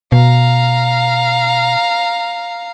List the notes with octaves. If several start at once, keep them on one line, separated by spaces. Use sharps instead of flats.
B2 F5 A#5